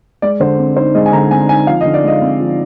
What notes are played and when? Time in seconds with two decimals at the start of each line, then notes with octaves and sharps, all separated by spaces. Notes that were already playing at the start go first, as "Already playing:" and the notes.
0.22 G#3 D5
0.40 D3 C5
0.58 C4
0.77 D#4 C5
0.95 G#3 D#5
1.06 G#5
1.13 D3 A#5
1.31 C4 G#5
1.49 D#4 G#5
1.67 F3 F5
1.81 D3 D#5
1.94 D5
2.04 G#3 D#5
2.22 C4
2.40 F3